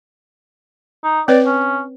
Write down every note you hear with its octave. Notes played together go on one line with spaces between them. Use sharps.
D#4
C4 B4 C#5 D5
C#4